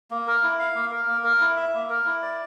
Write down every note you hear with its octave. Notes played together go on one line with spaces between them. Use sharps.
A#3
A#4
E4
F5
A#3
A#4
A#3
A#4
E4
E5
A#3
A#4
E4
D5